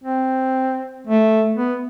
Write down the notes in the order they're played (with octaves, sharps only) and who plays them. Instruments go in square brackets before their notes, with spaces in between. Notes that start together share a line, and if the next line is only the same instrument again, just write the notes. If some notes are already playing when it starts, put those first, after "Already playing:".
[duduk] C4
A3
B3